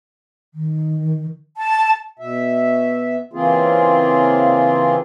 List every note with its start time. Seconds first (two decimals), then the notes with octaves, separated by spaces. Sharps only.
0.54 D#3
1.57 A5
2.19 B2 E5
3.33 C#3 E3 A#3 C4 F4 G#4